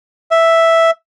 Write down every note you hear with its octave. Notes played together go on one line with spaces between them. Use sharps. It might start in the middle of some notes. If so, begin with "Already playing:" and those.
E5